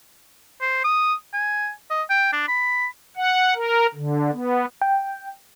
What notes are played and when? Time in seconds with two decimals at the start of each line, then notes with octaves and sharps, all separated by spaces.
0.61 C5
0.84 D#6
1.33 G#5
1.91 D#5
2.10 G5
2.33 D4
2.48 B5
3.17 F#5
3.55 A#4
3.95 D3
4.32 B3
4.81 G5